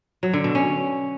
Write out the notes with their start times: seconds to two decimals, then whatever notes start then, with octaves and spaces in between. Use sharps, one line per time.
0.23 F#3
0.33 D3
0.44 B2
0.55 C#4